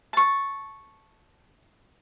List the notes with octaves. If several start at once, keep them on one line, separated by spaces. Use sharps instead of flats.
A5 C#6